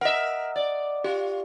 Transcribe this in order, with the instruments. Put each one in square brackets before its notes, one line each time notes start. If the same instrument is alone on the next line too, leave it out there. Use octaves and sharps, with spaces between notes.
[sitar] A#4 E5 [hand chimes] D#5 F#5
[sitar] D5
[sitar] F4 [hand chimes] G4